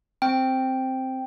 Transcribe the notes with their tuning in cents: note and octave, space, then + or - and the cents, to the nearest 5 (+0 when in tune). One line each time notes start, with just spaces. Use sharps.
C4 +0 G5 +0